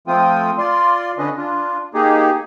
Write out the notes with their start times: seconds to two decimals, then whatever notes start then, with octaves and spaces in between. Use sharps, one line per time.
0.08 F3 A3 C4 F4 G5 D#6
0.58 F4 D5 C6
1.18 D3 C#4 D4 B4 D#5
1.37 D4 F4
1.94 A#3 D#4 G4 G#4